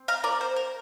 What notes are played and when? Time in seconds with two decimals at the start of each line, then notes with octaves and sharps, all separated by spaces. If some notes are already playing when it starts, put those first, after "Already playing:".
Already playing: C4
0.08 F5 A#5
0.24 A#4 D5
0.41 C5
0.56 A#4